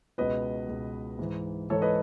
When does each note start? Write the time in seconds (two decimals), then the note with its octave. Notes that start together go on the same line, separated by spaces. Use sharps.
0.18 C#2 B2 B4 D#5
0.68 C#2 B2
1.19 G#2 E3
1.70 G#2 E3 A4 C#5
1.82 B4 D#5